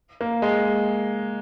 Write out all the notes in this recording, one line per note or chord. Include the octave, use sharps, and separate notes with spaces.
A#3
G#3